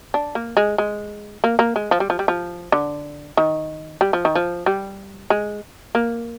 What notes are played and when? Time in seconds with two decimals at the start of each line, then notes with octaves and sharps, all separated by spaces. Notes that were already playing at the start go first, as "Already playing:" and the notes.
0.14 D4
0.35 A#3
0.57 G#3
0.78 G#3
1.44 A#3
1.59 A#3
1.76 G#3
1.91 F3
2.00 G3
2.10 F3
2.19 G3
2.28 F3
2.72 D3
3.37 D#3
4.01 G3
4.13 F3
4.25 D#3
4.35 F3
4.66 G3
5.30 G#3
5.95 A#3